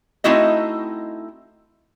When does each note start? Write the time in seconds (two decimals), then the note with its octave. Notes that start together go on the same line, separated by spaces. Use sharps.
0.24 A3 C4 D#4 E4 F#4 D#5